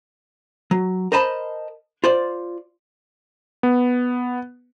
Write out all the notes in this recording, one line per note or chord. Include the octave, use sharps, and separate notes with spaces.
F#3
A#4 C5 D#5 A5 B5
F4 C5 D5
B3